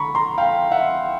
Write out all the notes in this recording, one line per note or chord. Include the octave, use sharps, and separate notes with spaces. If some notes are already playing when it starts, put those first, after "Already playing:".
Already playing: D3 A#5 B5 C#6
A#5 C6
F5 G5
E5 F#5